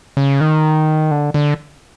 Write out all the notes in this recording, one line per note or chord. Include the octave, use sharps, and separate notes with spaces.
C#3
D#3
D3
D3